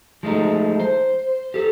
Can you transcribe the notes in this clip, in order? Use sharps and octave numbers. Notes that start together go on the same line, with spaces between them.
F3 G#3 A3 D#4
C5
G4 A4